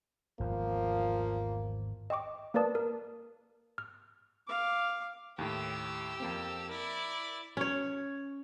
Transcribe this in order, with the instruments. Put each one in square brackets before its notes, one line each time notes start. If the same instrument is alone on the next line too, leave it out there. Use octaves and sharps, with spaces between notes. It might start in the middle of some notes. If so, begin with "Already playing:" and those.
[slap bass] G#1 E2 [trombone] F3 [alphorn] A#3
[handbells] D#5 G5 C#6 D6
A#3 A#4 B4 D5 A5 D#6
A#4
F6
[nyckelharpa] F5 D6
[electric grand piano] D#2 A2 [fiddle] G4 E6
[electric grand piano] F2 A#3 C4
[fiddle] E4 D5 [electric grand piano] A#4
[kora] C#4 C#5